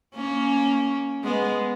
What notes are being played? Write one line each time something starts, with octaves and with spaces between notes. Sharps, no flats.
A#3 C#4
G#3 B3